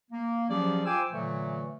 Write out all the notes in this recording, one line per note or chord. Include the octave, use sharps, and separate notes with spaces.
A#3
F3 F#3 C#4 G4 G#4 D5
F4 C5 G5 G#5 D6 E6
A#2 D3 E3 F#3 A3